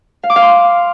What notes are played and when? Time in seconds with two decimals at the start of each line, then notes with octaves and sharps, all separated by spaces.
0.23 F5
0.30 D6
0.36 F5
0.42 C6